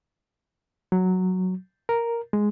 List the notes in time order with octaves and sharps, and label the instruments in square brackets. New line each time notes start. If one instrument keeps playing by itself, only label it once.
[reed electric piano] F#3
A#4
G#3